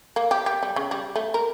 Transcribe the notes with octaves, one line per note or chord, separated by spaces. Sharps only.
A#3
G4
G4
G3
C#3
G3
A3
A#4